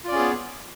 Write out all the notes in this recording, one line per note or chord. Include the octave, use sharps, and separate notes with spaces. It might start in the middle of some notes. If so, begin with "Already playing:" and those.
B3 C#4 F4 G#4 D5